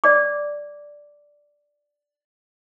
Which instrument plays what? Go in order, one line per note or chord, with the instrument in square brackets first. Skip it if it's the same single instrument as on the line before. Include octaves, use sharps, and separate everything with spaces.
[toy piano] D5 D6